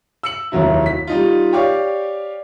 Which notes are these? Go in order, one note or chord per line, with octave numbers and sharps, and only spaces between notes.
E6 C#7 F#7
F1 D#2 F#3 E4
B6
G3 D#4 F4
G4 C#5 D5 F5 C#6